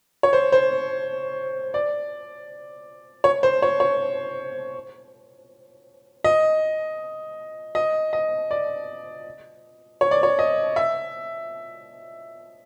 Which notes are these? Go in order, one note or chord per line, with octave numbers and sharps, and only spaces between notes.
C#5
C5
C5
D5
C#5
C5
C#5
C#5
D#5
D#5
D#5
D5
C#5
D5
C#5
D#5
E5